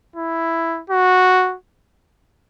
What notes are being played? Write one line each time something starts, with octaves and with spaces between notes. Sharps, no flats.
E4
F#4